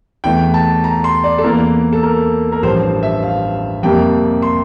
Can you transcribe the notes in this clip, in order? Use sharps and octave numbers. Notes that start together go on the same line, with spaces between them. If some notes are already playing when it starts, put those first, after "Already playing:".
E2 E3 A3 G5
A5
A#5
C6
D5
A4
E2 E3 A#3 A#4
A4
A#4
A#4
A1 G2 F3 C5
E5
F5
F2 C3 G3 A#3 G5
C6